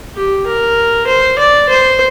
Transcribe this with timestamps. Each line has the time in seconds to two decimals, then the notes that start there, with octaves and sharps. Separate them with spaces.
0.16 G4
0.46 A#4
1.07 C5
1.39 D5
1.69 C5